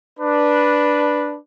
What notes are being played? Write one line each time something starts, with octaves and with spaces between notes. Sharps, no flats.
D4 B4